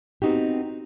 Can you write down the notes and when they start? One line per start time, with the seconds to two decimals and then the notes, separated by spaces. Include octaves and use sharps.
0.22 B3 C4 D#4 F#4 G4